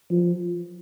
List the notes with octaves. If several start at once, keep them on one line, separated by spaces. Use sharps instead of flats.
F3